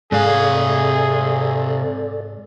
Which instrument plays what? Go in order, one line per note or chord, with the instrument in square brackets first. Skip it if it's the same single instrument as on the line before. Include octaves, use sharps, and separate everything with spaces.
[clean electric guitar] G#2 [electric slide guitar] C3 F5 [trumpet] G#4 [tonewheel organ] A4 D5